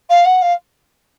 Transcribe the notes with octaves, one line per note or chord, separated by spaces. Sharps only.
F5
F#5
F5